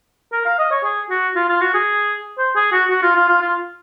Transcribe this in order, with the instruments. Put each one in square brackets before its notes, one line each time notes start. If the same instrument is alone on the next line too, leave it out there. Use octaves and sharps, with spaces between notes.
[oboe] A#4
F5
D#5
C#5
G#4
F#4
F4
F4
F#4
G#4
C5
G#4
F#4
F#4
F4
F4
F4
F4